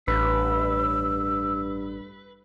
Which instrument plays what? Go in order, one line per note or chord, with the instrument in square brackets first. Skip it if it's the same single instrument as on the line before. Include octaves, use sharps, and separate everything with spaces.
[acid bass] A1 [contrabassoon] G2 [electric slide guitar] B4 [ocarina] E6